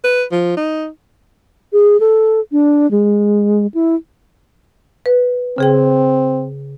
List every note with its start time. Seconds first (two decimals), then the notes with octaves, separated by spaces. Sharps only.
0.04 B4
0.32 F3
0.57 D#4
1.73 G#4
2.00 A4
2.52 D4
2.91 G#3
3.74 E4
5.06 B4
5.58 C#3 C4 G#4 G5